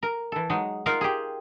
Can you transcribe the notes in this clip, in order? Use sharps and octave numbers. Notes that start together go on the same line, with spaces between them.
A#4
E3 A4
F#3 G#3 D#4
D#4 F4 A#4 F5 F#5
G4 G#4